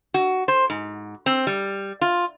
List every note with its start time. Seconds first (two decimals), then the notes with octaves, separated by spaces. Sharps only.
0.14 F#4
0.48 C5
0.70 G#2
1.26 C4
1.47 G3
2.01 F4